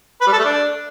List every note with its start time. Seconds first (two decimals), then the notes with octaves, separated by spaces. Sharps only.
0.21 B4
0.27 G3
0.32 A4
0.38 A3
0.44 D4